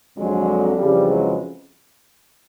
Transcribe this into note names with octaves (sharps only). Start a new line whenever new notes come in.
F2 D3 F#3 G#3
F2 C#3 E3 F3 G3
F#3 G#3